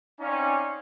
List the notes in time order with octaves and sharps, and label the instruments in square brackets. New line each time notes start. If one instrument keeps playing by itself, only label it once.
[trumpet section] C4 C#4 D#4 D5 F5 G#5